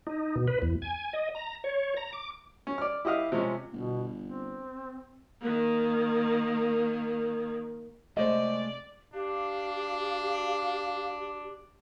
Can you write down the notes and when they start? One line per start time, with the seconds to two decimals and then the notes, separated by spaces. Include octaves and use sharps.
0.07 D#4
0.36 B2
0.48 B4
0.62 E2
0.82 G#5
1.13 D#5
1.35 A#5
1.64 C#5
1.97 A#5
2.13 D6
2.67 C#4
2.78 D5 F6
3.05 E4 G4 D#5 F5
3.32 C3 F3 G#3 C#4
3.73 G1 B2
4.23 C4
5.40 D#3 A#3
8.17 C3 G#3 A3 C5 D5 D#5
9.14 D4 G4 F5